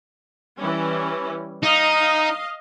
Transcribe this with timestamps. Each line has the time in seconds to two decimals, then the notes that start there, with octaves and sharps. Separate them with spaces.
0.57 E3 G3 C#4
1.63 D#4 D#5 F5